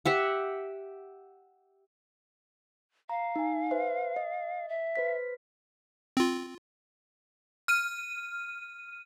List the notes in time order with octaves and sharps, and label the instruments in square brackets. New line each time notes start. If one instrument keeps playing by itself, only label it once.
[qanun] G4 E5 F#5
[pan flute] F5 [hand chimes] A#5
[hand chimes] D#4 G#5
B4 C5 E5
D#5
[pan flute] E5
[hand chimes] B4 C5 B6
[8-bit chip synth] C4 F4
[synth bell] F6 D#7